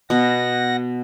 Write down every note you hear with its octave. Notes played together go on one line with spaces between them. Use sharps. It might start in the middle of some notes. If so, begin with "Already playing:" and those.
B2 B3 F#5 A#6